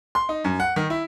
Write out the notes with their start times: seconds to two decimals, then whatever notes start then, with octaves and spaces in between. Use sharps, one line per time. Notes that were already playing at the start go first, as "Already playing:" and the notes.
0.15 C6
0.29 D#4
0.44 F#2
0.60 F#5
0.76 D#3
0.90 E4